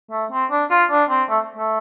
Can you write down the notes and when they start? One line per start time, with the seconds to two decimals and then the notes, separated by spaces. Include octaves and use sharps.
0.11 A3
0.31 C4
0.51 D4
0.70 F4
0.90 D4
1.10 C4
1.29 A3
1.56 A3